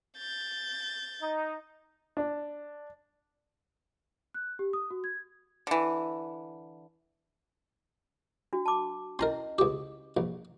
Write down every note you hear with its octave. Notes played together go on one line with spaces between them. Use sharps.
G6 A6
D#4
D4
F#6
G4
D#6
F#4
G#6
D3 E3
D4 F#4
A5 D6
C#4 E4 A#4 D#5 A#5 C6
C#2 G4
A#1